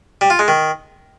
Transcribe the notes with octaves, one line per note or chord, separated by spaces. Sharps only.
G3
F4
G#3
D#3